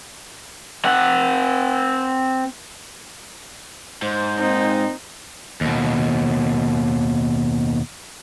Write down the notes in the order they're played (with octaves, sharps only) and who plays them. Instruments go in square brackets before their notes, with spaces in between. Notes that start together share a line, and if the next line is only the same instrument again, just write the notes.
[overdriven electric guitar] C4 F#5
[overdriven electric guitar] G#2 [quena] C5
[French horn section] A#2 A#3 C4 [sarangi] D#4
[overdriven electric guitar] D#2 B2